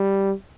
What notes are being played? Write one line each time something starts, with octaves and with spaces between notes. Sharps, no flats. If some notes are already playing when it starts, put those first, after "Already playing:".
Already playing: G3